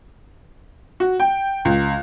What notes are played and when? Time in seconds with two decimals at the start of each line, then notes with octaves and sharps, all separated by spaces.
1.00 F#4
1.20 G5
1.65 C#2